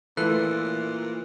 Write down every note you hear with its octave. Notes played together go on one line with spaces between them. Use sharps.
A#2 E3 A3 F4 A4 F#6